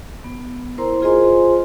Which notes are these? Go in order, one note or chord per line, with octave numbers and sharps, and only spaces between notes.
B3
E4 A#4 C5 A#5 C6
F4 G#4 C5 D#5 G#5 C6